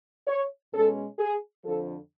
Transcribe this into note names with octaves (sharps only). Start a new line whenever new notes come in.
C#5
B2 G#3 C#4 A4
G#4
F2 D3 F3 A4